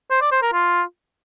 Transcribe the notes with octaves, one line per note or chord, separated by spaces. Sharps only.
C5
D5
C5
A#4
F4